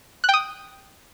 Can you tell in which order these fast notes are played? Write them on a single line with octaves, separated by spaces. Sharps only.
F#6 G5 D#6